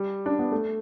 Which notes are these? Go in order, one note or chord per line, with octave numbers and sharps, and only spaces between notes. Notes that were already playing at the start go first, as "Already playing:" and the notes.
Already playing: G3
D4
B3
A3